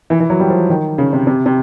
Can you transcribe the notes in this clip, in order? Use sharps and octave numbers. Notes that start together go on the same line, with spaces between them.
E3
E3
F#3
G3
F3
D#3
C#3
C3
C3
C3